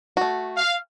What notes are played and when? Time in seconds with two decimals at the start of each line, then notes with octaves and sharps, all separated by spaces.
0.17 A3 F#4
0.57 F5